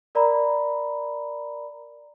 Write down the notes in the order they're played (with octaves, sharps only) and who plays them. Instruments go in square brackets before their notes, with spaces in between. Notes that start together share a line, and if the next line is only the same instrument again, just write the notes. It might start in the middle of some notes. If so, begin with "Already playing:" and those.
[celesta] A#4 D5 A#5 B5